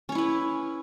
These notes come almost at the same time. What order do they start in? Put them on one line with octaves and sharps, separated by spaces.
C#4 C#5 E4 B4